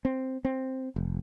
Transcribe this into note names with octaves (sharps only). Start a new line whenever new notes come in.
C4
C4
F1